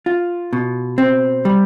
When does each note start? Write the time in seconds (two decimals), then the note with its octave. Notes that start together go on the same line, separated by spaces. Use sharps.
0.06 F4
0.53 B2
0.98 C4
1.45 G3